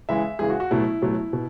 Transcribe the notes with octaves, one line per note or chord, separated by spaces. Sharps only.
C#3 E3 G#3 E5
C#3 E3 G#3 G#4
F#4
F#4
B2 F#3 A3 E4
B2 F#3 A3
B2